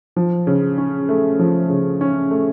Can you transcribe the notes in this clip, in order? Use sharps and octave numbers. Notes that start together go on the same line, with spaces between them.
F3
C#3
C#4
A3
F3
C#3
C#4
A3